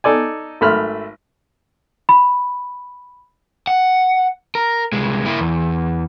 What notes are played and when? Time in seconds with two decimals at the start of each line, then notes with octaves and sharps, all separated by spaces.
0.04 D#4 A4 D5 G#5
0.61 G#1 A3 B5 F6
2.09 B5
3.67 F#5
4.55 A#4
4.93 C2 G#3
5.26 A#3 E4
5.41 E2